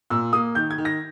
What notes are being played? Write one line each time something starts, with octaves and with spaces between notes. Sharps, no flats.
A#2 E6
A#3 D#6
D#3 G6
G#6
D#3
A#6